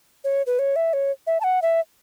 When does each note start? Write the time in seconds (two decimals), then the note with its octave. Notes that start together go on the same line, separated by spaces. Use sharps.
0.24 C#5
0.47 B4
0.59 C#5
0.76 E5
0.93 C#5
1.27 E5
1.41 A5
1.44 F#5
1.62 E5